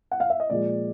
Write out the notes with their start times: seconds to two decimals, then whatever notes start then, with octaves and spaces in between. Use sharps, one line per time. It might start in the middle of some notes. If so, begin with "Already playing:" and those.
0.11 F#5
0.20 F5
0.30 E5
0.40 D#5
0.50 A#2 F3 G#3 D5